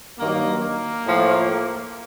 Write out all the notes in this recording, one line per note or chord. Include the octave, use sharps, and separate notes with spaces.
G2 D#3 F#3 A#3
A#3
A2 F3